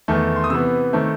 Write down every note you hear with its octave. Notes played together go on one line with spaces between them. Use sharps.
E2 D#3 A3
C6
D#6
C3 E3 B3 E6
D#3 A3 C4